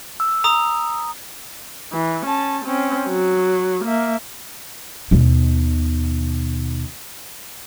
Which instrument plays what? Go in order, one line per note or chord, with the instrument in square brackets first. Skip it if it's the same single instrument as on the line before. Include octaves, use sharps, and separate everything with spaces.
[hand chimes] E6
[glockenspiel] A#5 D#6
[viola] E3
C#4 A5
C4 C#4
F#3
A#3 E5
[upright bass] D#2 B2